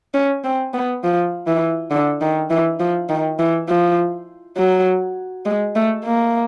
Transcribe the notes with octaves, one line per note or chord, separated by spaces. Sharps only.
C#4
C4
B3
F3
E3
D3
D#3
E3
F3
D#3
E3
F3
F#3
G#3
A3
A#3